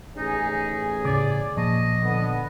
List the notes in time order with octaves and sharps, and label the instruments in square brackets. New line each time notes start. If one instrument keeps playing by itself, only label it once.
[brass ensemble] A1 C#4 G#4 [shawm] D#4
[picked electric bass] A2 C#3 [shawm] D5 [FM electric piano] D6
[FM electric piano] A#2 [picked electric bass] F3 [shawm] D#5
[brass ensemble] D3 B3